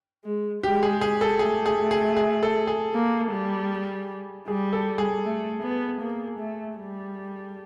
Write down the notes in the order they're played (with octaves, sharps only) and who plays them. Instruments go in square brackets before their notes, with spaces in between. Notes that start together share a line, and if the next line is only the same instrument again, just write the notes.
[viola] G#3
[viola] G#3 [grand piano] G4
[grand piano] G#4
G#4
A4
[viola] A3 [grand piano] G#4
[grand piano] G#4
[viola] A3
[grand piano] G#4
G#4
A4
G#4
[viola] A#3
G3
[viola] G3 [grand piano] G#4
[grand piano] A4
G#4
[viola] A3
B3
A#3
A3
G3